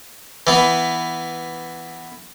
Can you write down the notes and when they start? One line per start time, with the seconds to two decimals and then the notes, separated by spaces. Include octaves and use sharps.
0.47 E3 B3